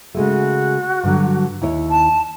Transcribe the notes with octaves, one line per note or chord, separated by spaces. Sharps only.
C#3 G#3 A3 F#4
G2 D3 F#3
D#2 E4 C#5
A5